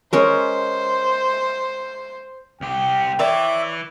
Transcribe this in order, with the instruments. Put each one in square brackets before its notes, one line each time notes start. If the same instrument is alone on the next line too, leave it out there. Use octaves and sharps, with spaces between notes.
[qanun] G#3 C#4 A#4 [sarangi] C5
[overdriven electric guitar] C2 G4 [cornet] G5
[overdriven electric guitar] E3 E4 [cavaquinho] C#5 D5 [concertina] E5